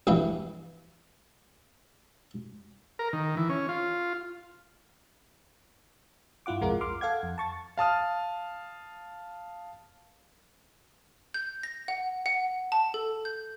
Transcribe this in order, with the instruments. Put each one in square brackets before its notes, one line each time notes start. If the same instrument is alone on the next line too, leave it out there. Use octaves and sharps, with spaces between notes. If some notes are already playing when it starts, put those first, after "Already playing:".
[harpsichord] A#1 G2 E3
[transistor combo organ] A#4
D#3
E3
C#4
F4
[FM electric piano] G2 E4 F4 F#5 D6
B1 F2 G#3 F4 A#4
C6 D6 F6
A4 F5 F#5 G#6
F2
A5 C#6 A6
[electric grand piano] F5 A5 D#6 F6
[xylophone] G6
A#6
F#5
F#5
A5
A4
G6